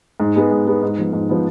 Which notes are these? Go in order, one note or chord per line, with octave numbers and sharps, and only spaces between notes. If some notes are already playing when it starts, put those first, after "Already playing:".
G#2
G#3 B3
G#2
G#3 B3
G#2
F3 B3
G#2
F3 B3